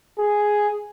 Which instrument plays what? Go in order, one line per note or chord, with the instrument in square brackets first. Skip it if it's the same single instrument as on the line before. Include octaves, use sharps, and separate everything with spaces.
[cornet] G#4